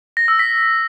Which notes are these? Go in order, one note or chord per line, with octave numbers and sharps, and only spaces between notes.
A#6
E6
B6